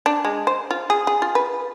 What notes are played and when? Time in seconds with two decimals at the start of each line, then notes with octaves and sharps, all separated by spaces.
0.06 D4
0.25 G#3
0.47 C5
0.71 F4
0.90 G#4
1.07 G#4
1.22 F4
1.35 B4